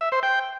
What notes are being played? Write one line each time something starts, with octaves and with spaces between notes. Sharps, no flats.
E5
C5
G5